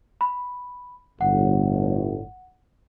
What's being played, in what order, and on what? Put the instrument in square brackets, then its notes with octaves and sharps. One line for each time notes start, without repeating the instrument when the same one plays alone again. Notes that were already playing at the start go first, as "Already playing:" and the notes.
[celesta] B5
[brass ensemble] G1 A2 [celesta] F#5